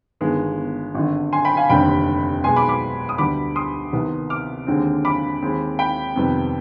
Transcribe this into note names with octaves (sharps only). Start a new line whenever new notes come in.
G1 G2 D#3 G#3 B3
G#1 G2 D3
G#5 C6
G5 B5
F5 G#5
F1 D#2 D3 G3 C4 G5 B5
B1 B2 G#3 B3 G#5 C6
B5 D6
B5 D6
D#6
D2 D3 G3 B3 B5 D6
C6 D#6
C2 C3 D#3 B3
D6 F6
D#2 D3 G#3 C4
B5 D6
D#2 D#3 G#3 C4
G5 B5
F2 C3 D#3 G3 B3